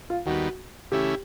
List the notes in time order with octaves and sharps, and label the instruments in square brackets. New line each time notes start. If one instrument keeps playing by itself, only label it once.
[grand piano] F4
[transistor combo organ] D#2 D#3 G3 B3 [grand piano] F#4
[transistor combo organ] C#3 E3 A3 C#4 E4 [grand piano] G4